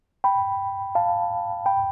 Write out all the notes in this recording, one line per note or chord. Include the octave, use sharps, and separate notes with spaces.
G5 B5
F5 A5
G5 B5